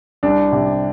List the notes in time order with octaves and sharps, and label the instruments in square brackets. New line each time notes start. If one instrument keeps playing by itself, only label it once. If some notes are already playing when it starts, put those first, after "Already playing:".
[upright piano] C2 D4
C3